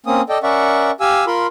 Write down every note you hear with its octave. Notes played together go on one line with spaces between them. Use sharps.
A#3 C4 C#4 D#6
A4 D5 D#5 G5
C#4 A#4 D5 E5 F#5 C#6
G4 F5 G#5 E6
F4 A#4 B5 C6